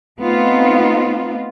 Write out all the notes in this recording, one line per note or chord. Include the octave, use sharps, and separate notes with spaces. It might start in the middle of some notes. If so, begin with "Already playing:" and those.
A3 B3 C4 D#4 F4